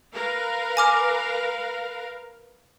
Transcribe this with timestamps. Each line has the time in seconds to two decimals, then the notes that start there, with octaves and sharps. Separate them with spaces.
0.12 A#4 B4 F5
0.77 G#5 D6 F6